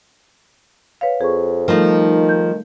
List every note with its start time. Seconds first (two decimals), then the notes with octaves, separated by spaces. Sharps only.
1.01 B4 C#5 F5
1.21 F2 G#4 C#6
1.68 D#3 F3 G3 A3 D#4 A4
2.29 G6